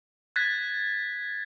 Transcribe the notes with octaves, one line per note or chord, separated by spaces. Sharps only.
F#6 G#6 A6 B6